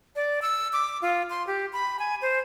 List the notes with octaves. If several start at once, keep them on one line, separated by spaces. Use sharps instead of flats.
D5
E6
D6
F4
C6
G4
B5
G#5
C5